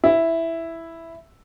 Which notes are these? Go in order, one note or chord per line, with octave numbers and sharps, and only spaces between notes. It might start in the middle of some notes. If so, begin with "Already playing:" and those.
E4